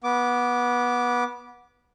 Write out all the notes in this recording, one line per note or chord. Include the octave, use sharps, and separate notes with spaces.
B3 D6